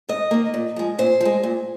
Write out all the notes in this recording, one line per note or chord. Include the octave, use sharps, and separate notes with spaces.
G#2 D#5
D#3 A#3
A#2
F3 G#3
A#2 C5
F3
G#3
A#2